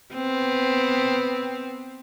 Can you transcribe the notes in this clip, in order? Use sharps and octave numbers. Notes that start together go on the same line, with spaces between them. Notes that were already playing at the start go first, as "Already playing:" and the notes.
B3 C4